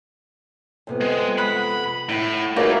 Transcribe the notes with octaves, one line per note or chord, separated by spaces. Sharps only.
F2 C3 B3
G#3
F#5 B5
A2 E4
A3 A#3 D#4 F#4 G#4 A#4 C#5 B5